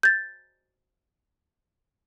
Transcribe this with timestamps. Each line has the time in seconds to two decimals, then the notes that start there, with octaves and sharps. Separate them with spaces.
0.03 G6 A6